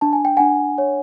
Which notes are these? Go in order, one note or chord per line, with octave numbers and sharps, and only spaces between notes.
D4 A5
G#5
G5
D4 F#5 G#5
C#5